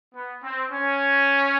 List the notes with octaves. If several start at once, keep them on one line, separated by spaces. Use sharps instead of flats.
B3
C4
C#4